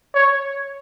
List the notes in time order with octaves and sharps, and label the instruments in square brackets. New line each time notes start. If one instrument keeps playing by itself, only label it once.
[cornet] C#5